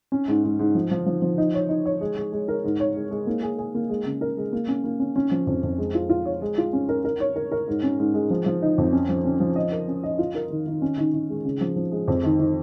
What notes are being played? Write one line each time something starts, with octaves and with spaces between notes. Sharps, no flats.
C#4
G#2
G#2
G#2
F3
F3
F3
F3
D#4
C#5
D#4
C#5
G#3
G#3
G#3
A#4
G#2
C#5
G#3
G#3
A#3
G#4
G#4
A#3
G#3
C#3
A#4
G#3
A#3
C#4
A#3
C#4
C#4
F3
F2
F2
G#3
F4
F4
C#5
G#3
F4
C#4
A#4
A#4
C#5
A#4
A#4
G#2
C#4
G#2
G#3
F3
F3
D#4
F2
C#4
F3
C#4
F3
D#5
A#4
C#4
D#5
F4
A#4
D#3
D#3
C#4
D#3
D#3
G#3
C#3
F3
F3
G#3
F2
D#3
D#3